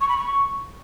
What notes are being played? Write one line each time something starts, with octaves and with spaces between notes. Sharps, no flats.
C#6
B5
C#6